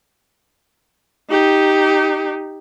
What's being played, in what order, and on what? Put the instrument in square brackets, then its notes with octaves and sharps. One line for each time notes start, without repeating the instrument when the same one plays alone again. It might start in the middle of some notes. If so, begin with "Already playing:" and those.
[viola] D#4 G4